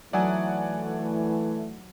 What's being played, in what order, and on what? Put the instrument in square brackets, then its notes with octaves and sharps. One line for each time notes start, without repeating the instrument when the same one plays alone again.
[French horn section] E3 A3 [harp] F#3 D#4 E5 [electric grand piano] D5 F#5 G#5